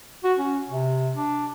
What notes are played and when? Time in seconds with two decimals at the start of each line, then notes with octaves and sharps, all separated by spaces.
0.24 F#4
0.39 C#4
0.69 C3
1.16 D4